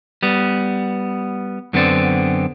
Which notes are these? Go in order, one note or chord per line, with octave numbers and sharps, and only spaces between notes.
G3 B3
F#2 D3 B3 C4 D5